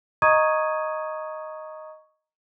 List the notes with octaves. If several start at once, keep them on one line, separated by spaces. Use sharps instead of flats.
D#5 A#5 C#6 D#6 G#6 D#7